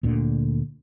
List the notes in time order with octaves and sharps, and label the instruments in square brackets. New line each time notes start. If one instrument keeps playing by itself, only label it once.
[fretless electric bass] D2 A#2 D3